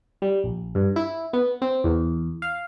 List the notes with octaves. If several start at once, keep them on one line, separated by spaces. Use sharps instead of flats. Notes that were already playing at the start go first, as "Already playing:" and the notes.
G3
A#1
G2
E4
B3
C4
E2
F5